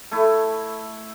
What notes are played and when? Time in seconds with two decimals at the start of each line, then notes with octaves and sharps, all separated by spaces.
0.12 A3 E4